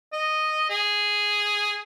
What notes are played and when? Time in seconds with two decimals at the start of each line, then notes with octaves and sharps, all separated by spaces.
0.13 D#5
0.70 G#4